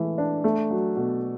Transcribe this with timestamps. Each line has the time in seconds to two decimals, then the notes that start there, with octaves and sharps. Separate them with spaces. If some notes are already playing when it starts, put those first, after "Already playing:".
Already playing: E3 G#3 A3
0.18 D4
0.44 A3
0.70 F#3
0.97 B2